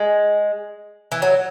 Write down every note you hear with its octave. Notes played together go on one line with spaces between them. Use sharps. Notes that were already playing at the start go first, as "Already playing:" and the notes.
Already playing: G#3
E3
F#3